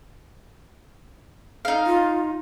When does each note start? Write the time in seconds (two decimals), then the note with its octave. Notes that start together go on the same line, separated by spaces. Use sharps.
1.65 D#4 F5
1.86 F4